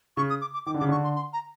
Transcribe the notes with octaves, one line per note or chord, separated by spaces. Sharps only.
C#3 C#6
D#6
D6
D6
D#3 D6
D3
C#3 D6
D3 C#6
C6
C6
A#5